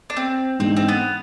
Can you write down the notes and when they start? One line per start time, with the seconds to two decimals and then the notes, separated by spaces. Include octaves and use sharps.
0.10 D4
0.17 C4
0.59 G#2 E3 G#3 C4 D4
0.77 C4
0.88 B3